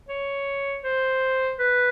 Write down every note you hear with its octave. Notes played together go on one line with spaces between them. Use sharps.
C#5
C5
B4